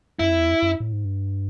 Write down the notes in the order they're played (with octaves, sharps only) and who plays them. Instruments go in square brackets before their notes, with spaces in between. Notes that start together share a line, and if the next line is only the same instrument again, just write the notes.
[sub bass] F#2 [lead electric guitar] E4
[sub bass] F2
E2
F2
F#2
A2
G#2
G2